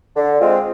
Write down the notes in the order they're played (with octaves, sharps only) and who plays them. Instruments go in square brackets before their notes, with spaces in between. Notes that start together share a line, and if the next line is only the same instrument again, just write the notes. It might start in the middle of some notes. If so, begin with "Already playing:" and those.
[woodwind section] D3
G#3 C4 F4